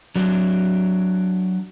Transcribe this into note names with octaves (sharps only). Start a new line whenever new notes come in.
F#3 D4